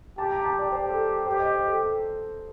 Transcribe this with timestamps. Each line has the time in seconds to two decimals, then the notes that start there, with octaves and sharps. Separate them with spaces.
0.18 G4 A5
0.31 A#5
0.45 A5
0.59 D5
0.71 G4 C5
0.90 A4
1.26 G4 C5
1.39 D#5
1.53 C5
1.67 A4
1.80 A4